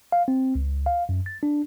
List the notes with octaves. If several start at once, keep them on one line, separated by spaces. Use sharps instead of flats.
F5
C4
C#2
F5
F#2
A6
D4